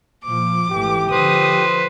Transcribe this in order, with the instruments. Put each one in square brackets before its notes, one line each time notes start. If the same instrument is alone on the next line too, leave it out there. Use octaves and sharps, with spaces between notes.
[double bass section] A#2 F3 [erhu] D6
[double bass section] G#1 E3 A3 [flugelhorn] G4
[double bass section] D3 F3 [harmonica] B4 C5 [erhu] D#6